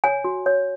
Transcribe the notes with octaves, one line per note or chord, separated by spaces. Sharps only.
C#5 G#5
F#4
C#5